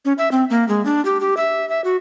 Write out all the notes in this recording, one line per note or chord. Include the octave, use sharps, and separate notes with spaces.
C#4
E5
C4
A#3
G#3
D4
G4
G4
E5
E5
F#4